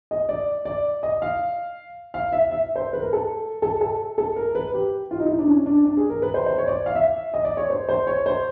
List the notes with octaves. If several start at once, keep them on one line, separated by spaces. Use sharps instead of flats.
D#5
D5
D5
D#5
F5
F5
E5
E5
C5
B4
A#4
A4
A4
A4
A4
A#4
B4
G4
F4
D#4
E4
D4
C#4
D4
D4
G#4
A#4
B4
C5
C5
C#5
D5
F5
E5
D#5
D5
C#5
C5
C5
C#5
C5